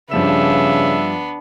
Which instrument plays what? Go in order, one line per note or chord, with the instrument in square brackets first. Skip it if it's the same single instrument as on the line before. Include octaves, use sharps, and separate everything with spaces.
[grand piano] G2 F3 E7 [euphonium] C#3 [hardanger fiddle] B3 D4 [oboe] E5